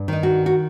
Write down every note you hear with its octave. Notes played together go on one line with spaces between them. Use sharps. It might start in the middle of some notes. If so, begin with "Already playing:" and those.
Already playing: G2
D#3 D#4
F#4
F#4